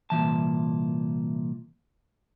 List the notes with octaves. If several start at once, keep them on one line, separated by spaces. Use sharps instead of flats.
C2 A#2 E3 A5